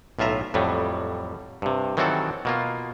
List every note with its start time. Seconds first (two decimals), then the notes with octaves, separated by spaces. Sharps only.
0.19 B1 A2 F4 E5 A#5
0.54 F2 A2 F#3 G3
1.62 G2 C3
1.97 D#3 E3 F#3 C4 F#4 A4
2.45 B2 A#3 F4